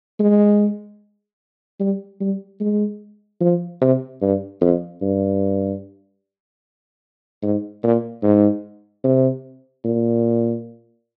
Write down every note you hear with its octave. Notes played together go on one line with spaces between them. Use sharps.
G#3
G3
G3
G#3
F3
C3
G2
F2
G2
G#2
A#2
G#2
C3
A#2